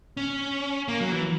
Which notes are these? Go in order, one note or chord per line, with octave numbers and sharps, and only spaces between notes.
C#4
A#3
F#3
E3